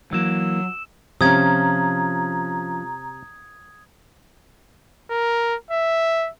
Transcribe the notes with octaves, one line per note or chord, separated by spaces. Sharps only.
E3 F#3 A#3 E6 E7
C3 F3 C#4 A#5 D#6 G#6
A#4
E5